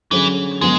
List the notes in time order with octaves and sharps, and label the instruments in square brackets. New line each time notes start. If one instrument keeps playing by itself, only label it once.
[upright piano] D3 F#3 C#4 G#4 [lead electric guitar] E3
[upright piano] D3 F#3 B3 [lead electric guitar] G#3